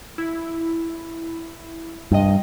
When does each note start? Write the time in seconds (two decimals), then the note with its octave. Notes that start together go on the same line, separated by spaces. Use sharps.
0.18 E4
2.11 G2 C3 D#5